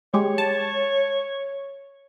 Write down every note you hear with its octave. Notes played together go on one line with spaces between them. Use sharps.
G#3 G4 C#5
A5